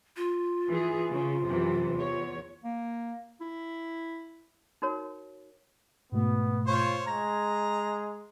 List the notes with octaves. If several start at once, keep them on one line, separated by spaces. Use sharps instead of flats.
F4
E3 G#4
C#3
F#2 C3 E3
E2 C#5
A#3
E4
D#4 F#4 A#4 C#5
G#2 B2 A3 B3
F4 C5 C#5
G#3 A#5 G#6 A#6